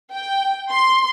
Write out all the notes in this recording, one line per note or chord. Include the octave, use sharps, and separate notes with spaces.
G5
C6